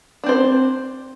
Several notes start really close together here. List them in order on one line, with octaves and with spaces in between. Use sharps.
D4 C4 C5